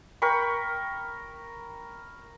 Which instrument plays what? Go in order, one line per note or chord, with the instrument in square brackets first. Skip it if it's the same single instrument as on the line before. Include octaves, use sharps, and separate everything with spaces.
[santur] A#4 G5 B5 C#6